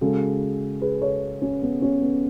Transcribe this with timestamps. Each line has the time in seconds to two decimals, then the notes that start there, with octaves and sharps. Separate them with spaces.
0.01 C#3 G#3 F#4 A4
0.81 G#4 B4
1.02 A4 C#5
1.42 C#4
1.62 B3
1.82 C#4
2.02 B3